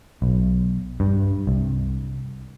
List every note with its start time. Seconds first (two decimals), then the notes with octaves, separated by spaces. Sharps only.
0.22 B1
1.00 G2
1.47 C2